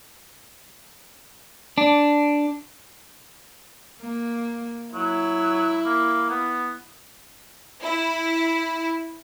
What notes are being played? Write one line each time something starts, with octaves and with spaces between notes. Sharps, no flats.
D4
A#3
F#3 E4
A#3
B3
E4